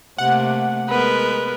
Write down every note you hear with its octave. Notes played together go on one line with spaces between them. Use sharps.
C3 A3 A#3 F#5
G#3 B3 A#4 B4